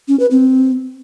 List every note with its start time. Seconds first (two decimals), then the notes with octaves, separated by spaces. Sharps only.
0.08 C#4
0.20 B4
0.31 C4